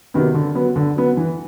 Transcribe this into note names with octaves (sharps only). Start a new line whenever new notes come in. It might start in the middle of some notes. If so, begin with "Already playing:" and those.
C3 D#3 F#3 B3
D3
F#3 B3
D3
F#3 B3
E3